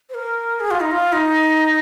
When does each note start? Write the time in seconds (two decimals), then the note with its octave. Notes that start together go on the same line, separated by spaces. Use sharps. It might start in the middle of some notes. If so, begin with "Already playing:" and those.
0.09 C5
0.14 A#4
0.60 G#4
0.71 F4
0.81 D#4
0.91 F4
1.12 D#4